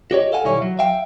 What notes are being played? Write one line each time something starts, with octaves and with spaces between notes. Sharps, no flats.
F#4 G4 C#5 D#5
A4 F5 F#5 G#5
B1 D#3 G3 E4 C#5
F#3
E5 F5 G5